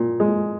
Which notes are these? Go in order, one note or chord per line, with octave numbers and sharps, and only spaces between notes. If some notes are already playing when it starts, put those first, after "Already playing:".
Already playing: A#2
G#3